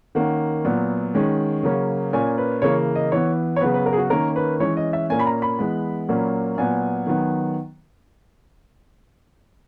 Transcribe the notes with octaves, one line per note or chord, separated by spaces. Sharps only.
D#3 A#3 C#4 F#5
A#2 F#3 B3
D#3 G#3 C#4
C#3 F#3 A#3 C#4
A#2 A#3 C#4 G#5
B4
C#3 E3 A#3 C#5
D#5
E3 B3 C#5
C#5
C#3 F#3 B3 B4
B4
A#4
G#4
F#4
D#3 A#3 C#4 A#4
B4
E3 G#3 C#4 C#5
D#5
E5
A#2 A#3 C#4 G#5
B5
A#5
B5
E3 G#3 B3
A#2 F#3 A#3 C#4
A#2 F#3 B3 G#5
D#3 F#3 B3